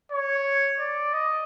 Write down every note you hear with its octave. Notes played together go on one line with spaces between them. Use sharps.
C#5
D5
D#5